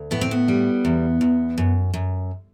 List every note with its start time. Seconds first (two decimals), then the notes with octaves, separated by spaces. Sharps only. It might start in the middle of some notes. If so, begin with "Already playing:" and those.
Already playing: D2
0.11 A2 B3
0.21 C4
0.31 B3
0.48 G3
0.85 E2
1.21 E2
1.58 F#2
1.94 F#2